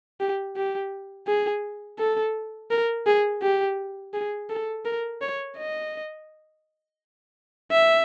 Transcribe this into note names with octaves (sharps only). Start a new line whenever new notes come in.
G4
G4
G#4
A4
A#4
G#4
G4
G#4
A4
A#4
C#5
D#5
E5